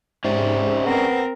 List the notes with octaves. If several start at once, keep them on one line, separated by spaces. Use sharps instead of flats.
G#2 C3 C#4 G#4 D5
B3 C4 A#4